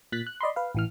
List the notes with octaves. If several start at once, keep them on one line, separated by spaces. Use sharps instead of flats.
A#2 F#6 A6 B6
F#6
D5 D#5 B5 C6
B4 F5
A1 E3 F6